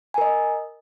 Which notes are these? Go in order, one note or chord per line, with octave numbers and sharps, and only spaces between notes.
A#4 D#5 G#5